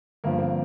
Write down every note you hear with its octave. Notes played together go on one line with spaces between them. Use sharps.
G1 G2 F3 A#3
C4